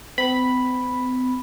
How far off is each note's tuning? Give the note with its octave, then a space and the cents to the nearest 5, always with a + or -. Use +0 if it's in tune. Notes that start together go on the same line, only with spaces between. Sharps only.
C4 -45 B5 +0